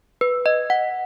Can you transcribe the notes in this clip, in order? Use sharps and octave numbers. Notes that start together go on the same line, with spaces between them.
B4
D#5
F#5